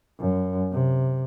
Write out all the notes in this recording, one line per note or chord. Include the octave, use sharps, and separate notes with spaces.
F#2
C3